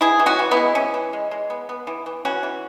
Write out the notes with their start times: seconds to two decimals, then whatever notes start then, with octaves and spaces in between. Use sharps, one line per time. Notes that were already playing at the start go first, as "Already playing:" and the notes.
0.01 E3 E4 G#4
0.19 E3
0.26 C#4 F#4
0.39 E3
0.51 B3 E4
0.57 G#3
0.75 E3 C#4
0.94 E3
1.13 G#3
1.31 G#3
1.50 B3
1.69 B3
1.87 E3
2.06 E3
2.25 E3 C#4 F#4
2.43 E3